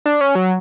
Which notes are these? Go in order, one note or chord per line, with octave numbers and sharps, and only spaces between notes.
D4
C#4
F#3